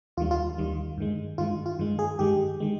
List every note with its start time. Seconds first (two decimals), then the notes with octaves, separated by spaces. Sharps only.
0.17 D#2 D#3 G3 F4
0.31 F4
0.58 D#2 D#3 G3
0.98 G2 D#3 G#3
1.38 G2 D#3 G#3 F4
1.66 F4
1.79 G2 D#3 G#3
1.99 G#4
2.19 G2 D#3 G#3 G4
2.60 D#3 G#3